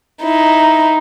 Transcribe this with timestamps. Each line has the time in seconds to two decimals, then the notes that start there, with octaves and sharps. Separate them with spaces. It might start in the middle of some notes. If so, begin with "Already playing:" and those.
0.23 D#4 E4